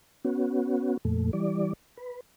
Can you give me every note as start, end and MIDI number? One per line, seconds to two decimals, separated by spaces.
0.25 0.97 59
0.25 0.97 61
0.25 0.97 66
1.05 1.31 41
1.05 1.31 46
1.05 1.31 57
1.33 1.73 52
1.33 1.73 55
1.33 1.73 74
1.97 2.20 71